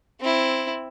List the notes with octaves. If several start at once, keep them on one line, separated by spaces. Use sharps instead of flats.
C4 E4